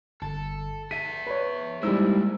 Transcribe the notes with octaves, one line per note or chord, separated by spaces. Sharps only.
G1 A4
G#4 E5 B6 D#7
B4 C#5
G3 G#3 A#3 D#4 E4 C5 E6